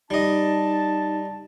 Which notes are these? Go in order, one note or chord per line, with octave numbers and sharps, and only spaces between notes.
G3 D#4 D#5 A5